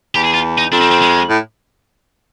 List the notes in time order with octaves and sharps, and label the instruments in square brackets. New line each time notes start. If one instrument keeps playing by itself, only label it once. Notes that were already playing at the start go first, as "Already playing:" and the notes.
[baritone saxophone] E2 [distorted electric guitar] G4
[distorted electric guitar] G#4
F4
D#4
[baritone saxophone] F2 [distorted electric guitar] D4
[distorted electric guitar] C4
C4
G#3
[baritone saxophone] A2